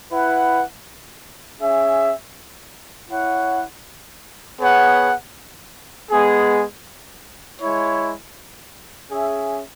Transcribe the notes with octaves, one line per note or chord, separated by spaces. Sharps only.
E4 B4 F#5
C#4 G#4 E5
E4 C#5 F#5
B3 G#4 C#5 F#5
G#3 B3 G#4
G#3 E4 C#5
C#4 G#4 E5